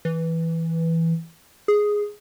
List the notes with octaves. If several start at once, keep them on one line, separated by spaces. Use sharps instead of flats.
E3
G#4